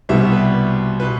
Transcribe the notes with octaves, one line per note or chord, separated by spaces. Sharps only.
C2 B2 G3 B3 E5
B4
B4
B2